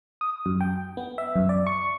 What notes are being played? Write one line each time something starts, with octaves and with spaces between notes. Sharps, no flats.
D#6
F#2
G5
B3
E5
F#2
D5
C#6